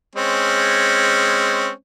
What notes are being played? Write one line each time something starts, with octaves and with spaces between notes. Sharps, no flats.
G#3 C4 C#4